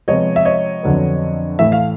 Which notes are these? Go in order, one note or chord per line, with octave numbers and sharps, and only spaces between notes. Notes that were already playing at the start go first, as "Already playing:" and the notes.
C3 F3 G#3 B3 C#5 D#5
E5
C#5 D#5
F2 D3 F#3 B3
A2 E3 A3 E5
F5